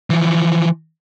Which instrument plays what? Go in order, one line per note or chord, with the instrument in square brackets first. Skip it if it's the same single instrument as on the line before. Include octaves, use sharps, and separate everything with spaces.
[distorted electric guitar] E3 F3